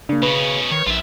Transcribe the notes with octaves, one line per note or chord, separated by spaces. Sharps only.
C#3 A#3 D4
B2 C#4 B4
D#3 C#5
A#1 F4 E5